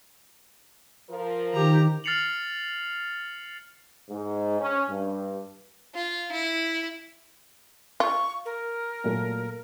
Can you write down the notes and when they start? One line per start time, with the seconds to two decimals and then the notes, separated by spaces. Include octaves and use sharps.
1.09 F3 A#4
1.53 D#3 G4 A#5
2.04 F6 A6 C7 C#7 F7 F#7
4.10 G#2
4.60 C#4
4.89 G2
5.95 F4
6.32 E4
8.00 F4 C#6
8.45 A#4
9.04 A#2 F#3 A3